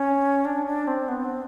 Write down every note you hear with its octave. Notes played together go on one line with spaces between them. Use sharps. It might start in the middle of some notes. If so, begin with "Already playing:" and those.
Already playing: C#4
D4
D4
C4
B3
C4